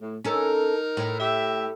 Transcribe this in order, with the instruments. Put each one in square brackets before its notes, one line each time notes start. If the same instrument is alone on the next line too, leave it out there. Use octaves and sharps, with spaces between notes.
[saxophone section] A2
[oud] C#4 A4 [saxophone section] D#4 A#4
[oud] A2
[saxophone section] G4 E5